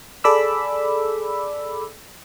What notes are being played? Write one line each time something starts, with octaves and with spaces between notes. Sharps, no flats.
G#4 A4 D5 B5 D6 E6